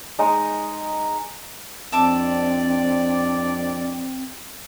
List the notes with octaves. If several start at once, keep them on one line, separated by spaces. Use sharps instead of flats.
G#3 D#4 A#5
F2 C4 D4 D5 E5 A5 D6